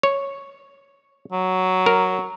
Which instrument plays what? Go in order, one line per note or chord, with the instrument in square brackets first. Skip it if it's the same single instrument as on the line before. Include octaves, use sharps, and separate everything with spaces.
[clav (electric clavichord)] C#5
[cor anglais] F#3
[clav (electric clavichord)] A#4